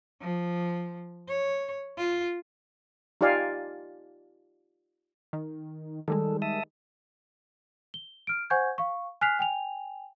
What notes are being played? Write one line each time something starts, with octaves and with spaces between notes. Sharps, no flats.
F3
C#5
F4
D#4 F4 G4 D5 F5 G#5
D#3
D#3 G3 G#3 A4
E5 A5 D#6
G7
F6 D7
C5 F#5 G#5 C#6 G6 G#6
F5 C#6
G#5 F6 F#6 B6 C7 F7
G5 G#5 F7